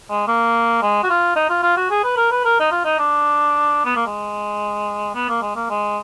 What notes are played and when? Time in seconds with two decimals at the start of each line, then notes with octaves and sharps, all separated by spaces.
0.10 G#3
0.28 A#3
0.82 G#3
1.03 F#4
1.10 F4
1.36 D#4
1.50 F4
1.63 F4
1.77 F#4
1.90 G#4
2.04 B4
2.17 A#4
2.31 B4
2.45 A#4
2.60 D#4
2.71 F4
2.85 D#4
2.99 D4
3.85 B3
3.96 A#3
4.07 G#3
5.15 B3
5.29 A#3
5.42 G#3
5.56 A#3
5.70 G#3